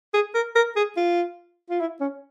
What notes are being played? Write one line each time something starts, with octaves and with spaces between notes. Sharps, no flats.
G#4
A#4
A#4
G#4
F4
F4
E4
C#4